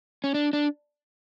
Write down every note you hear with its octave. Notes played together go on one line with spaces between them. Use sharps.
C#4
D4
D4